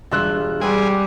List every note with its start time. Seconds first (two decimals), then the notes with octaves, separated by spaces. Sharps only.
0.11 E1 G2 F4 E5 F#6
0.61 G3 C4 G#4 B4 F#5